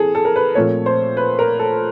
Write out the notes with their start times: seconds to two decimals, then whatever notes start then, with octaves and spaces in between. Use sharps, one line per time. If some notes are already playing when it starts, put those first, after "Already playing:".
Already playing: E3 C4 G#4 A4
0.15 A4
0.25 A#4
0.36 B4
0.55 A#2 F3 A3 C4 C#5
0.86 C5
1.17 B4
1.39 A#4
1.59 A4